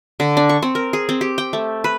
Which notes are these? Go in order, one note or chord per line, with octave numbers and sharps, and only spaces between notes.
D3
D4
C#6
C4
A#4
G#4
C4
G4
G5
A3
B4